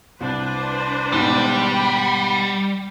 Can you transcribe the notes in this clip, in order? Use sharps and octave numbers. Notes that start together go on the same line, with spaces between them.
C2 D4 B4 C5
D#2 G#2 B2 G3 G5 B5